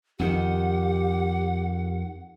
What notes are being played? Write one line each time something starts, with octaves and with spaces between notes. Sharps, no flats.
F2 D#3 G4 F#5